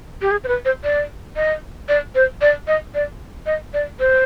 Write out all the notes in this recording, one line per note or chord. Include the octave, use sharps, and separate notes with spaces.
G4
G#4
C5
B4
C5
D5
D#5
D5
C5
D5
D#5
D5
D#5
D5
C5